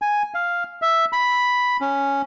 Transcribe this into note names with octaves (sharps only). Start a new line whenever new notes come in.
G#5
F5
E5
B5
C#4